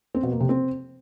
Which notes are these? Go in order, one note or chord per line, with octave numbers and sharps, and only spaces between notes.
C4
B2
A#3
C3
C4